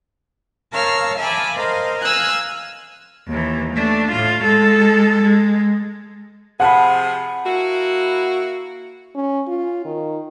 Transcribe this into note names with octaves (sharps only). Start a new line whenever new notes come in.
A#4 C#5 F5 A5 E6 F6
E5 F5 G#5 A5 B5 D6
A#4 C5 D#5 F5
F5 G#5 E6 F#6 G#6
D#2 E3
A3 D4
A2 F4
G#3 A4
G#3
C3 F3 G#4 F#5 A5 B5
A#3 E4 F#4
C#4
F4
D#3